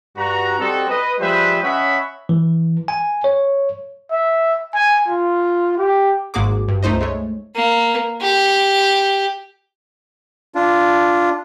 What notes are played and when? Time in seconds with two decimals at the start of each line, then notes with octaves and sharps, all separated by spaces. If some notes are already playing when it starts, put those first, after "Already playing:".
0.16 G2 F#4 A#5
0.59 G3 C4 D#4 F#4 A4
0.88 B4 D#5
1.19 F3 G3 G#3 B4 C5 E5
1.62 C#4 C#5 D#5 E5 F#5 B5
2.29 E3
2.88 G#5
3.24 C#5
4.11 E5
4.74 G#5
5.08 F4
5.78 G4
6.34 G#1 G#2 A#3 F#4 G#4 D6
6.68 G2
6.83 C#2 A3 D#4 C5 D#5
7.01 G#3 A3 C#5
7.55 A#3
8.21 G4
10.55 D4 F4